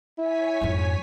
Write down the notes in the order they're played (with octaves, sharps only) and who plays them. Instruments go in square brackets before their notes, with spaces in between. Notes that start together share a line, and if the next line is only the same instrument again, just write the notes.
[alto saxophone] E4 [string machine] C#5 G#5 B6
[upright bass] F2 G#2